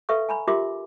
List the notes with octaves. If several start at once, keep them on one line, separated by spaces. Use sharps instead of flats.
A4 B4 E5 F5 C#6
G#5 A#5 B5
F4 G4 A#4 E5 C6 D6